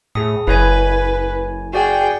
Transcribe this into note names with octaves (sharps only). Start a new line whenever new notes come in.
A2 G#4 D#6
F#1 E4 B4 C#5 G#5
F#4 G#4 D5 F#5 G5